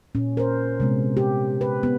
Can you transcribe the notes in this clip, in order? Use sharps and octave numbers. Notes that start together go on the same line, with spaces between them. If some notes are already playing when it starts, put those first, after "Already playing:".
A#2 C#4
A#4 C5
C3 G#3 B3
G4
B4
B3